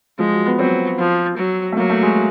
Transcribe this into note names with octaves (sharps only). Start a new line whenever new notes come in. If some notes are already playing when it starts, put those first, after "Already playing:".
F3 G#3
F#3
B3
F#3 C4
F3
F#3
A3
F#3 A#3
A3
G#3